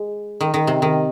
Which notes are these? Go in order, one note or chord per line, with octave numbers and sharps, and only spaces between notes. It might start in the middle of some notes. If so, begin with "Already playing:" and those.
Already playing: G#3
D#3
D#3
C3
D#3